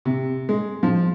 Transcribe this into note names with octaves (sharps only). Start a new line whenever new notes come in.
C3
G#3
F3